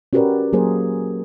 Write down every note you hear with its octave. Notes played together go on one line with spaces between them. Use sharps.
C#4 F#4 G4 A#4 B4 D5
F#3 A#3 G#4 A#4 C5